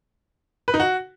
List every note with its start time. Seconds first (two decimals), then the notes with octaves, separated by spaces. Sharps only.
0.68 B4
0.74 D#4
0.80 F#4